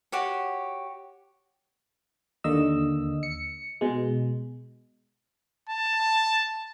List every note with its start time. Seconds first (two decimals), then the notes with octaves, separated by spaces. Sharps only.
0.12 F#4 G4 C#5
2.44 D#2 D3 A#3 D#5 E6
3.23 C#7
3.81 B2 G#3
5.69 A5